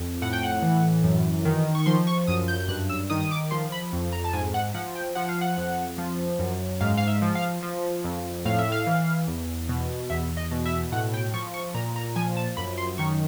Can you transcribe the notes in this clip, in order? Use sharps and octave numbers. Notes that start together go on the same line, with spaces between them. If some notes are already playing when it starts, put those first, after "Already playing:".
Already playing: F2
A2 F#5
G5
F#5
E3
F#2
D#3
C#6
F3 C6
C#6
F#2 D#6
G6
G6
G2 F#6
E6
D#3 D#6
D#6
D6
F3 C6
B5
F2
A#5
A5
G#2 G#5
F#5
F3 F#5
G5
F3 F#5
F5
F#5
F2
F3
F#2
G#2 F5
F5
E5
F3
F5
F3
F2
A2 F5
E5
F5
E3
E2
B2
E2 E5
D#5
B2
E5
A2 F#5
G5
F3 C#6
C#6
A#2 A#5
A#5
F3 G#5
A5
F#2 B5
C6
D#3 C#6